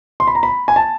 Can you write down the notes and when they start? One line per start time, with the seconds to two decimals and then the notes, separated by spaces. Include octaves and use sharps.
0.20 C6
0.27 B5
0.35 A#5
0.43 B5
0.68 G#5
0.76 A5